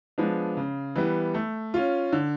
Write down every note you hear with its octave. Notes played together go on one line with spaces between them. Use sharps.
F3 G#3 B3 D4
C#3
E3 G3 B3
A3
C#4 F4
D3